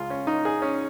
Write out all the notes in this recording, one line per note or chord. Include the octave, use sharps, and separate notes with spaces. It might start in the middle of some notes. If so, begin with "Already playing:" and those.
Already playing: C#2 C#3 G#3 F4
C#4
D#4
G#4
C#4